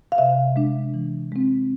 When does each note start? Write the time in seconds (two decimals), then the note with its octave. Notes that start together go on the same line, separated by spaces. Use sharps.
0.12 F5
0.18 C3 E5
0.56 G#3 D4
0.94 E3
1.32 G#3 C4